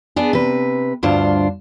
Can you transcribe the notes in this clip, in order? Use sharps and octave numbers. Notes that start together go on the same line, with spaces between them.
B3 D4 G#4
C3 B4
D2 G2 D4 F4 C5